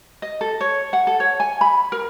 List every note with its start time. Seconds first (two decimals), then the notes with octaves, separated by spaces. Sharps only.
0.22 D#5
0.41 A4
0.61 C#5
0.93 F#5
1.07 A4
1.20 C#5
1.40 G#5
1.61 B5
1.92 A#4